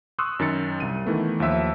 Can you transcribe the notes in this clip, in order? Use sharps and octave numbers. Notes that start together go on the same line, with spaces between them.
C6 C#6 D#6 E6 F#6
F#2 D#3 A6 C#7
C2 D#7
D#3 E3 A3 B3
D#2 F3 E5 E6